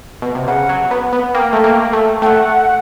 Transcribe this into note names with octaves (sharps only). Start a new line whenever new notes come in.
B2
C3
C#3 F#5
F#3
B3
B3
A#3 G5
A3
G5
A#3
A3
A3 F#5 G5